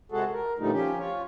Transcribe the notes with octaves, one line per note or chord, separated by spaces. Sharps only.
C3 G#3 F#4 G#4 A4
A#4
A#2 D3 F3 G3 A3 D#4
F3 C#4 G4
F4 C#5